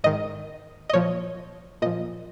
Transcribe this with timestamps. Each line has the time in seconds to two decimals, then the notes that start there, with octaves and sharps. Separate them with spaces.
0.04 G#2 D#3 D#5
0.89 D#5
0.93 A#2 F3 C#5
1.82 A#2 F3 D#5